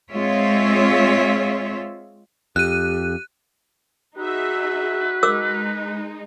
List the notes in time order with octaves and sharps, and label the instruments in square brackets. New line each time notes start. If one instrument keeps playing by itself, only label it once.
[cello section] G#3 C4 F4 G#4 C#5 E5
[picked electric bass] F2 [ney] G4 [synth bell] F#6 D#7
[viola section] D#4 G#4 E5 [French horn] F#4 [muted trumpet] B4
[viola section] G#3 D#4 [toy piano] A#4 D6 E6